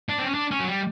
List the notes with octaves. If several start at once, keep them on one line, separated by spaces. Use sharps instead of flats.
D4
C4
C#4
D4
C#4
F#3
G3